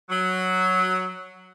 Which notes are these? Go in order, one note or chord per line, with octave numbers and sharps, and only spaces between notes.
F#3